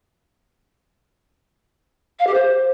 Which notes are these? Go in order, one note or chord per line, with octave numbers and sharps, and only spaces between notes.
F5
G4
C5